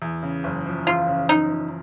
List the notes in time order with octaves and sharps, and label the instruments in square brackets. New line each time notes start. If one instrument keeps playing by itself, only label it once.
[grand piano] E2
C#3
F#1
F3
[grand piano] E2 [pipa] F4
[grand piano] C#3
[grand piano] F#1 [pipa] D#4
[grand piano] F3